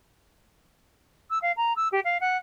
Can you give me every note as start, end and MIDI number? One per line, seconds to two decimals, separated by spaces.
1.30 1.38 88
1.42 1.52 77
1.56 1.73 82
1.76 1.88 88
1.92 2.00 67
2.04 2.17 77
2.20 2.37 78